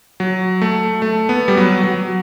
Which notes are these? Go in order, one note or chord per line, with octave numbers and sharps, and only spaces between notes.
F#3
A3
A3
B3
G3
F#3
F#3